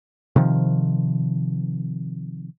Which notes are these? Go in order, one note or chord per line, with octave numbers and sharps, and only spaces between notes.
C3 D#3 F3